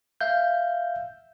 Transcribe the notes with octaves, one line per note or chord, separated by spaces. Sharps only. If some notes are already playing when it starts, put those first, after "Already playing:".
E5 F5 G6